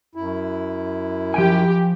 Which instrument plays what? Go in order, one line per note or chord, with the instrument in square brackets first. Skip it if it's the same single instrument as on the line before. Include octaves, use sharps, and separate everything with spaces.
[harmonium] F#2 E4
[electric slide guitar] F3 G5 G#5 [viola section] G4